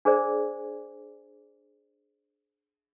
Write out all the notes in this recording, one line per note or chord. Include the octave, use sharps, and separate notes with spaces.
D4 G#4 A#4 C5 D5